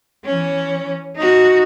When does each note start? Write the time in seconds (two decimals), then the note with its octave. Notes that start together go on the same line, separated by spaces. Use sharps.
0.25 E3 C#4
1.16 D#4 F#4